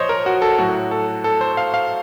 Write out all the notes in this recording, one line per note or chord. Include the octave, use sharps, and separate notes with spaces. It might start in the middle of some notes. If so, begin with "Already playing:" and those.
Already playing: A#2 F3 C5 C#5 D#5
A#4
F#4
A4
A2 F#3 F#4
A4
A4
C5
F5
F5